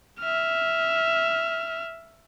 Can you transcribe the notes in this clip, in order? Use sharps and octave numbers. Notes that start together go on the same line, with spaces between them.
E5 F6